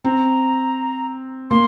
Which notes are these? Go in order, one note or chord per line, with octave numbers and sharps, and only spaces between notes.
C4 A#5
A#3 C6